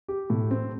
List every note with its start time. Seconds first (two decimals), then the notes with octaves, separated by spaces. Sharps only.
0.08 G4
0.30 A2
0.51 C4